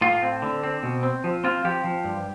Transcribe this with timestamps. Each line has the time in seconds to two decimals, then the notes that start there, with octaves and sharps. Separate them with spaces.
0.01 A2 F4
0.22 C4
0.42 D3
0.63 C4
0.83 B2
1.03 C4
1.24 F3
1.44 C4 F4
1.64 F3 G4
1.84 F3
2.04 G2